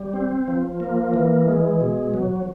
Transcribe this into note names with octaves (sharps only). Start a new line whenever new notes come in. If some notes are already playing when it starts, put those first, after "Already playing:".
Already playing: G3
C4
F3
A#3
E3
G#3
B2
F#3